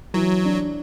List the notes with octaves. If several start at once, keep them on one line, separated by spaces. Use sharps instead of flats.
E3 F#3
D4